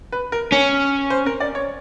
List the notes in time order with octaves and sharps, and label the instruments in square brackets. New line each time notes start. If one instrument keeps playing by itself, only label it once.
[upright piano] B4
A#4
[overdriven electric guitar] C#4
[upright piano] C5
A#4
D5
C#5